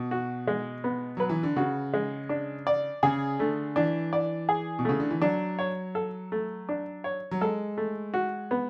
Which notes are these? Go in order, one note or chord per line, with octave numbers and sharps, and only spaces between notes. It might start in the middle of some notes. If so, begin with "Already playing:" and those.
Already playing: B2
F#4
G#3
B3
F#3 B4
E3
D3
C#3 F#4
G#3
D4
D5
C#3 G#4
D3 A3
E3 D4
D5
G#4
B2
C#3 A3
D3
E3
F#3 D4
C#5
A4
A3
D4
C#5
F#3
G#3 A4
A3
F#4
B3